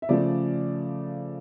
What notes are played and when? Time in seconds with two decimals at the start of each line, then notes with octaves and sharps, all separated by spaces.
0.02 E5
0.09 C#3 F3 A3 D5